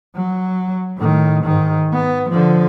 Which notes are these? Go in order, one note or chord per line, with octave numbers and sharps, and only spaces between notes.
F#3
A2 D#3
G#2 D#3
B3
D3 F3